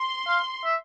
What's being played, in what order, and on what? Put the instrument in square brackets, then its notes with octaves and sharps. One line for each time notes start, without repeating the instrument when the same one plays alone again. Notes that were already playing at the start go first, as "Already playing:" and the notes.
Already playing: [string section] C6
[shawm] F5
E5